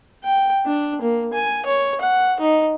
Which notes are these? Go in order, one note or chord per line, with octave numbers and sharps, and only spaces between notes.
G5
D4
A#3
G#5
C#5
F#5
D#4